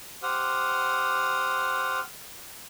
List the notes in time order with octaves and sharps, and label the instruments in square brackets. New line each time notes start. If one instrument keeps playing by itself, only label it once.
[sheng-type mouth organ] G4 C5 F#5 D#6 F6